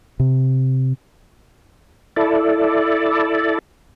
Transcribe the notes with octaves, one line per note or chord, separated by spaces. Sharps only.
C3
E4 A4 D5